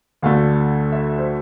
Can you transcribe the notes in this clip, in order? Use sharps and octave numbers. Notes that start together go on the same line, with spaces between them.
D2 D3 A3 F5
E5
C5